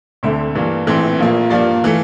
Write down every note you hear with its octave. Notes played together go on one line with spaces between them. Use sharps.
D2 D3 A3 C4 E5
G2 E3 A#3
A#1 A2 E3 A3 C4
A#1 A#2 F3 A#3
G2 F3 A#3 D5
E3 A3